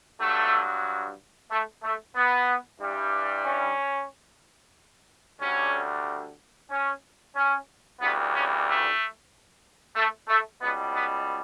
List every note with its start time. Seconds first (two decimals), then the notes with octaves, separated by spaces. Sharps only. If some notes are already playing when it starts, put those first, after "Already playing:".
0.20 G2 F#3 A3
1.50 A3
1.83 A3
2.15 B3
2.80 G2 E3 G3
3.45 C#4
5.40 D2 D3 G3 C#4
6.70 C#4
7.35 C#4
8.00 D2 C#3 E3 G3 B3
8.33 C#4
8.65 A3
9.96 A3
10.28 A3
10.61 C#2 B2 G3 B3
10.93 B3